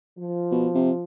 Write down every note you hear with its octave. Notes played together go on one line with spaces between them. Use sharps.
F3
B2
C3